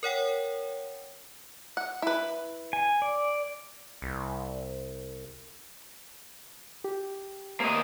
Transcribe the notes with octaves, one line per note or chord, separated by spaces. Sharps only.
A#4 C#5 F#5 G5
F#5
E4 B4
G#5
D5
C2
G4
A#3 D#5